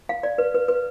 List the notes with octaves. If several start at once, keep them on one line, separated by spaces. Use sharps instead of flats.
F5
D5
B4
B4
B4